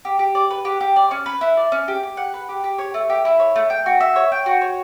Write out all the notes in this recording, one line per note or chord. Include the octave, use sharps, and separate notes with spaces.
G4
G4
D5
B4
G4
G4
D5
C#4
B4
E4
D5
C#4
G4
G4
F#5
B4
G4
G4
C#5
A3
G4
E4
C#5
A3
G5
F#4
E5
C#5
G5
F#4
C#5